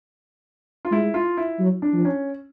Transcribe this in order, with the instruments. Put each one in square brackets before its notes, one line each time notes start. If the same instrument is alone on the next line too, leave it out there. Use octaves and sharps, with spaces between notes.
[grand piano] F4
[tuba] G#3 [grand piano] E4
[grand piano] F4
E4
[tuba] F#3
[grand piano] D4
[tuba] F3
[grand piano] C#4